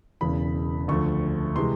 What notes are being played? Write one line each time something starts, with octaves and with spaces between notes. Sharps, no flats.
E1 E2 C#3 E3 B5
D2 D3 F3 A3 C#6
C3 E3 G#3 C6